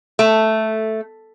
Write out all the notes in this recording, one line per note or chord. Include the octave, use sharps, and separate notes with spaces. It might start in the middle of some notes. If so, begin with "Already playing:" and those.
A3